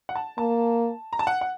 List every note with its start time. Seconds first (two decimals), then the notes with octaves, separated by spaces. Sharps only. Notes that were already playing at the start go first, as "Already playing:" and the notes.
0.09 F#5
0.15 A5
0.38 A#3 A5
1.13 A#5
1.19 A5
1.27 F#5
1.41 F#5